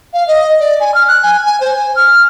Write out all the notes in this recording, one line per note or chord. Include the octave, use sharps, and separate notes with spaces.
F5
D#5
D5
G#5
F6
F#6
G#5
G#5
C5
G#5
F6